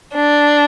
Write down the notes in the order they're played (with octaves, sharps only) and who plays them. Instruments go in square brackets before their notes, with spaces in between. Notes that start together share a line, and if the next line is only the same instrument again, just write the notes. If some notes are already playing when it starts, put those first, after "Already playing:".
[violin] D4